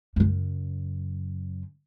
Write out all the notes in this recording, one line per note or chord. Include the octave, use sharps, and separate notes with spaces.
F#2 C#3